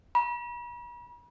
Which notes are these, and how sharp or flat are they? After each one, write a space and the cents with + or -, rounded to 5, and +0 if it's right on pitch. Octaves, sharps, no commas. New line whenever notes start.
B5 -45